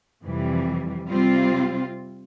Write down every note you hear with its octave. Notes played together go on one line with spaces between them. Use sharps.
F2 C3 E3 G3
C3 G3 C4 F4